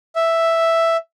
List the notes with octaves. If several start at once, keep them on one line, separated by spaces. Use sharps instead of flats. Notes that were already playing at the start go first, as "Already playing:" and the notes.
E5